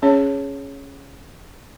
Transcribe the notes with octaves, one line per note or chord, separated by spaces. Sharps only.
C#4 G#4 C#5